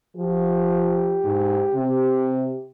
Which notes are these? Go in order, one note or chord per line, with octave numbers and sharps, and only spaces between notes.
F3 G4
G#2
C3